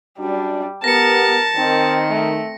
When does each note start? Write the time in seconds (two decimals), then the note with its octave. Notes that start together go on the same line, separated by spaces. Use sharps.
0.19 F#2 G3 D4 F#4
0.84 B3 G4 A#4 A5 A#6 C#7
1.56 D#3 C4
2.10 A3